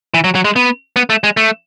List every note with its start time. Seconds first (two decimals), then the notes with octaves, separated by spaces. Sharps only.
0.14 E3
0.24 F#3
0.35 F#3
0.45 G#3
0.56 B3
0.96 B3
1.10 A3
1.24 G#3
1.37 A3